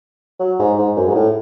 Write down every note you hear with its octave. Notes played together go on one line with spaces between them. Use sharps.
F#3
G#2
G#2
F#2
G#2
A2